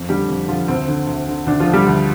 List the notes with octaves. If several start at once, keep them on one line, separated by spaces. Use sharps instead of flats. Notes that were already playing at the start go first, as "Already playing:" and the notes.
Already playing: F2
D3 G3 G4
F2
D3 F3 F4
D2 C4
D3
D2
D3
D2 D4
F3 F4
D3
G3 G4
D2